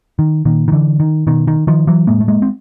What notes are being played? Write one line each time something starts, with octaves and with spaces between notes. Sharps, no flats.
D#3
A#2 D#3
D#3
D3 E3
D#3
B2 D#3
D#3
D#3 F3
E3 F#3
A2 G#3 A#3
A3
G#3 A#3
C4